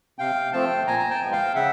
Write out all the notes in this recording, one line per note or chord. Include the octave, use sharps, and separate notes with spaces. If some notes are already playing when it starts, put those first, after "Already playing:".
C3 F5 G5
F3 A3 C4 G5 A5
A#2 G#5 A#5
A#5
G5 A5
F3 G#3 B3
F5 G5
C#3 E5 F#5